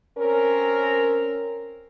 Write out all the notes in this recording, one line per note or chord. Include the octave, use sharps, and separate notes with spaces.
C4 C#4 A#4